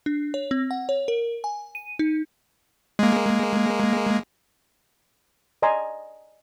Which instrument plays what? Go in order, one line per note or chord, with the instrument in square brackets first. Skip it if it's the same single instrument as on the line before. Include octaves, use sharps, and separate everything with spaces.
[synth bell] D4
C#5
C4
F#5
C#5
A#4
G#5
D#7
D#4
[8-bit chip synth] G#3 A#3
[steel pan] D5 D#5 G#5 A#5 C6